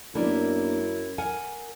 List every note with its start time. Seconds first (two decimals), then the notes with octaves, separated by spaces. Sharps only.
0.15 F#2 A#3 B3 D4 E4
1.18 A#4 F#5 G#5